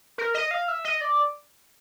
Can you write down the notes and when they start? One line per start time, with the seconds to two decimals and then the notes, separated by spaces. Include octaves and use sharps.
0.18 A#4
0.35 D#5
0.51 F5
0.68 E5
0.85 D#5
1.01 D5